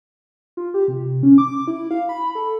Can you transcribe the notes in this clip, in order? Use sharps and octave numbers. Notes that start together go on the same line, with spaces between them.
F4
G4
C3
C#4
D6
E4
F5
B5
A4